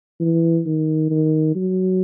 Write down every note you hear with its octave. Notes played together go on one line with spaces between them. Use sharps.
E3
D#3
D#3
F#3